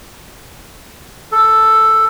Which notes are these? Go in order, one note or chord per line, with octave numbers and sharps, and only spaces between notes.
A4